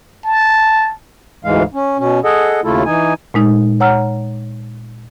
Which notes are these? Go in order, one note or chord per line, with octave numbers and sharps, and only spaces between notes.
A5
D2 G#2 E3 G#3 F5
C#4
B2 C#4
G#4 A4 D#5 F#5
D#2 C#3 A3 E4 F4 A4
E3 D#4 G#5
A#2 G#3 D#4
C#5 F#5 A#5 E6 F6